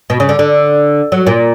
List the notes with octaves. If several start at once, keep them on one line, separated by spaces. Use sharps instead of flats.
B2
C#3
D3
D3
F#3
A#2